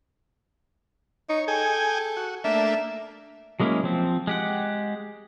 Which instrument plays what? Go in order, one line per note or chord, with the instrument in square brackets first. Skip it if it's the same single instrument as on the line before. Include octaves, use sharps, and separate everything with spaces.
[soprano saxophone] D#4 [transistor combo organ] C#5
[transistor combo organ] G#4 G5 G#5 [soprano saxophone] A4
[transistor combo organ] F#4
[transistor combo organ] A3 A#3 D4 [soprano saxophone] E5
[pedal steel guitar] F#3 G#3 A#3 C#4 E4
F3 C4
G#3 G4 F#5